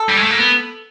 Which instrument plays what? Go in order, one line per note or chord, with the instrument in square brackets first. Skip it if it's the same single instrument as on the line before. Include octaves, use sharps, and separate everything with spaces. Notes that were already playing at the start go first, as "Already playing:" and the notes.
Already playing: [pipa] A4
[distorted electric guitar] G3
G#3
A3
A#3
B3